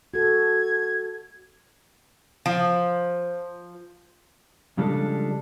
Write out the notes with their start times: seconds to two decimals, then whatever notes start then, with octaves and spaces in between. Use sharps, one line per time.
0.14 F#4 A4 G#6
2.46 F3
4.78 C#3 F3 G3 G#3 D4 A4